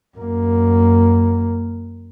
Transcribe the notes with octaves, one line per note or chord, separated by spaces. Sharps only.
F#2 A#3